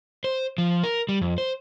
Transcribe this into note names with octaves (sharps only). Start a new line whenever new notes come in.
C5
F3
A#4
G3
F2
C5